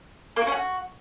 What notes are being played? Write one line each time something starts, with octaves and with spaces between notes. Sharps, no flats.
A#3
F#4
C#4
F#4